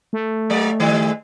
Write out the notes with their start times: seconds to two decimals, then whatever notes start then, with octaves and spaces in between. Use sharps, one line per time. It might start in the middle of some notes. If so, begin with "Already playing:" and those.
0.13 A3
0.50 F#3 A#3 D5
0.80 G#2 D#3 G3